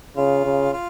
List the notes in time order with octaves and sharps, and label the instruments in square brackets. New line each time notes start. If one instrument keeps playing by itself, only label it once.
[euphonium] C#3 [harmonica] F4
[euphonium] C#3
[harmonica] F4